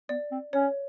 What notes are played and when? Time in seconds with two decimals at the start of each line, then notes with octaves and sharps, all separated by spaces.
0.09 B3 D5
0.31 C4
0.53 C#4 C#5